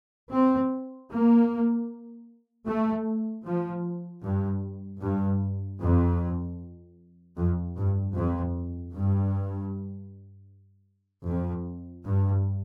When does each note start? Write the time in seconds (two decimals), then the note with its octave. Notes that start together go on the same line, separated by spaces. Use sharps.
0.33 C4
1.12 A#3
2.68 A3
3.46 F3
4.25 G2
5.02 G2
5.81 F2
7.37 F2
7.76 G2
8.15 F2
8.94 G2
11.28 F2
12.06 G2